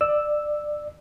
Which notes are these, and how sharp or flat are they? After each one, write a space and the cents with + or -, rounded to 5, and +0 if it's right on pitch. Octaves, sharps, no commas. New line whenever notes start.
D5 +20 E6 +0